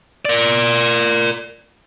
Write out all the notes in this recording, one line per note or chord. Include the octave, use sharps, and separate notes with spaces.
A#4 D5